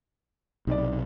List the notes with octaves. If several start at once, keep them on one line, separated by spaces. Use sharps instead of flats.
B1 C3 D#4 D5